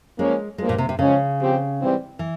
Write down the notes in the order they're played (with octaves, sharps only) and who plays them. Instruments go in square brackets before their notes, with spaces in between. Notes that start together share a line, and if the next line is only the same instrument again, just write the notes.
[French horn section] F3 A#3 C#4 [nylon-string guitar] G#3
[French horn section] G2 F3 A#3 F4 [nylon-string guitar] G#3
[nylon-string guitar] A#2
C3
C3
[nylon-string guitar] C#3 [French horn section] F3 G#3 C#4
[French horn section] F3 C4 G4
G#2 E3 G3 C4
[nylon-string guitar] E3